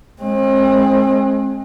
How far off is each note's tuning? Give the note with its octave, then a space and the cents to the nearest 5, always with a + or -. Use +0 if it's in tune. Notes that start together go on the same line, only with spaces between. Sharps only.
G#3 +20 C4 +40